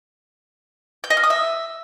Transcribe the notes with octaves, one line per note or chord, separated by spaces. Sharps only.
G6
D#5
F6
D#6
E5